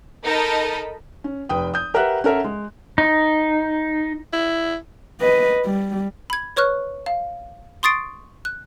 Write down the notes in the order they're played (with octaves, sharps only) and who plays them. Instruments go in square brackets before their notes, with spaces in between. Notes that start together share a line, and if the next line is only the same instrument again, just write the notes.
[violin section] D#4 A4 A#4 D#5 A5 B5
[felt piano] C#4
F1 B4 G5 D#6
D#6 G6
G4 A#4 B4 E5 F#5 F#6
C#4 A4 A#4 E5 F#5
G#3
[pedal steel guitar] D#4
[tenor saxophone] E4
[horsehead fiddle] B4 D#5
G3
[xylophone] B5 G#6
B4 C#5 C#6 F6 F#6
F5
C6 C#6 D#6 A6 C7 D7
F#6